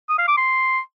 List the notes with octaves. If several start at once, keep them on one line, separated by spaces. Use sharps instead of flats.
D#6
F5
D6
C6